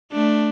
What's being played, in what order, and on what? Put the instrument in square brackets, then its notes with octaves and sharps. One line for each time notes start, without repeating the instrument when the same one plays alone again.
[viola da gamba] A3 D4